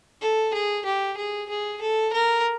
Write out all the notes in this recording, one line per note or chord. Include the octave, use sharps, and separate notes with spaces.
A4
G#4
G4
G#4
G#4
A4
A#4